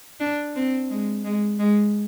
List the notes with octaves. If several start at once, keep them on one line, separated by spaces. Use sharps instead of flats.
D4
C4
G#3
G#3
G#3